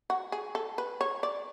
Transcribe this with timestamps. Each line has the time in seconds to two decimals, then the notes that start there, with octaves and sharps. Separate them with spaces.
0.10 F#4
0.32 G#4
0.55 A4
0.78 B4
1.01 C#5
1.23 D5